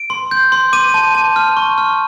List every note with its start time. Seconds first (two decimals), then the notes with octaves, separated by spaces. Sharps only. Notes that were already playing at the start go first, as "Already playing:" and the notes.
Already playing: D7
0.10 C6
0.31 G6
0.52 C6
0.73 D6 D#7
0.94 A5
1.15 A5
1.36 F6
1.57 C#6
1.78 F6